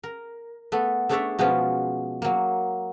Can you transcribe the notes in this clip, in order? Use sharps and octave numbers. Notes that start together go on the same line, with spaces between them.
A#4
A3 B3 A4
A3 D4 G#4 C#5 D5 E5
B2 F3 G#3 B3 C#4 F4
F#3 A#3